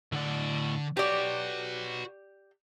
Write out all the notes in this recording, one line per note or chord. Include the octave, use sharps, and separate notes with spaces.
A2 D3 D5 F#5
F#4 G4 B4 C#5 D5